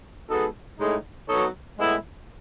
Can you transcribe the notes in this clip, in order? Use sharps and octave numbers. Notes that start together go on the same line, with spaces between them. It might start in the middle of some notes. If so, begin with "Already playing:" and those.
G#3 B3 D#4 F#4 A4
A2 G#3 D#4
F#3 B3 D#4 A4 C#5
A2 G#3 B3 E4